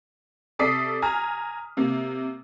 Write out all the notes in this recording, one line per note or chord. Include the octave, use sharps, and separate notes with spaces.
C3 A4 D5 D#6 B6 C7
G#5 A#5 F6
C3 A#3